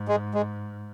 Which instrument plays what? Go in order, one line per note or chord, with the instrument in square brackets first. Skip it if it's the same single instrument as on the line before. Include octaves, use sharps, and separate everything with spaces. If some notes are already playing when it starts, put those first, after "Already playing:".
Already playing: [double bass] G#2
[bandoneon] G#3
G#3